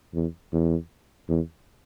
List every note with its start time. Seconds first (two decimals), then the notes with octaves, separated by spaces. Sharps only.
0.14 E2
0.53 E2
1.29 E2